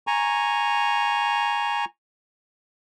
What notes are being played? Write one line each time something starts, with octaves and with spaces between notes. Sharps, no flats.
G#5 A#5 C#6